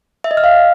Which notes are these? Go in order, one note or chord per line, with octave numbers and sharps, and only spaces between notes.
E5
D#5
F6
F5